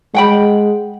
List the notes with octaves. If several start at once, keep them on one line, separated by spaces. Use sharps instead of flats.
G#3 F#5 G5 B5